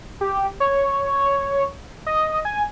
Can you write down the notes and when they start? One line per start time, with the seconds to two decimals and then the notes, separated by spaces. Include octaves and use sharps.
0.21 G4
0.60 C#5
2.06 D#5
2.45 G#5